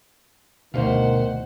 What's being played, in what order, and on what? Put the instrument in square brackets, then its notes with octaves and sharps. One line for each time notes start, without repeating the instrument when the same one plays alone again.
[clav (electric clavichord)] D2 F5 [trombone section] G2 D#3 [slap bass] B2 [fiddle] C5 F#5